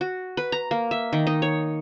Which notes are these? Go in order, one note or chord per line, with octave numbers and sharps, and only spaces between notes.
F#4
B4
A#5
A#3
E5
D#3
D#4
C#5